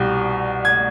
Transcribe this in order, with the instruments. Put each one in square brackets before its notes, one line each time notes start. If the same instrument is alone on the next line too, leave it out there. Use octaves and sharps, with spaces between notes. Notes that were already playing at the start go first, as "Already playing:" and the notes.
Already playing: [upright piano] C2 B2 G3
G#6